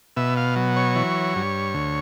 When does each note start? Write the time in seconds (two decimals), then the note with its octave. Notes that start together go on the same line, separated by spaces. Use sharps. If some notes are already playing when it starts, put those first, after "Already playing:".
0.17 B2 E5
0.37 F5
0.56 F#3
0.76 C#5
0.96 E3
1.36 G2
1.74 D2